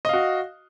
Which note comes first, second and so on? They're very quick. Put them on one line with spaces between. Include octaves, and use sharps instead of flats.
D#5 F5 F#4